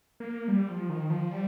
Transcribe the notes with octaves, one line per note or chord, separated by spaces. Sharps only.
A#3
G3
F3
D#3
F3
G3